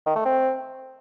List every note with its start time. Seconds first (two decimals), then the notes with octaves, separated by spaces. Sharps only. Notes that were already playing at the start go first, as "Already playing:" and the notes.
0.06 D#3
0.16 A3
0.26 C4